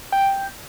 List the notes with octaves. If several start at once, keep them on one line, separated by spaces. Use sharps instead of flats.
G5